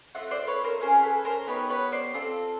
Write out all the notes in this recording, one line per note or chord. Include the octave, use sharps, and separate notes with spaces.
A3 C4 F4 E5 F#5
C5 D5
B4 C#5
A#4 C5
C#4 F4 G#4 A#4 C5
A4 B4
A#4 C5
B3 D#4 G4 B4 C#5
B4 C#5
C5 D5
C4 F4 A4